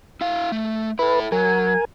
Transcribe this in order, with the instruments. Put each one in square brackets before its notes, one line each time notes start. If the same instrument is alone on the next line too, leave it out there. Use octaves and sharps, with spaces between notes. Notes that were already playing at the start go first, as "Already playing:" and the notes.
[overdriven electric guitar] E4 F5
A3
[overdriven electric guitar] E4 A4 [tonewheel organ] B4
[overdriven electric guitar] F#3 [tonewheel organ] A#4 G#5